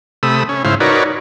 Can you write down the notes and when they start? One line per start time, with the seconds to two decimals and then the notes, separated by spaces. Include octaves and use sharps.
0.23 C3 A3 B5 D#6 E6
0.49 C#4
0.65 G#2 C#3 E4 C5 F5
0.80 D#4 F#4 A#4 B4 C#5 D5